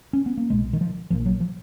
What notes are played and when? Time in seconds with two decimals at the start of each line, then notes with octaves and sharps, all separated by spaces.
0.13 C#4
0.26 B3
0.37 A#3
0.50 B1 A#2 G#3
0.73 D#3
0.81 F3
1.10 A#1 A#2 F3
1.26 F#3
1.40 F3